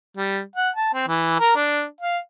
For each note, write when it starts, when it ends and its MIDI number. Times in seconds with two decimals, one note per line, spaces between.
0.17 0.41 55
0.56 0.70 78
0.76 0.90 81
0.94 1.07 60
1.08 1.36 52
1.39 1.53 70
1.56 1.85 62
2.01 2.18 77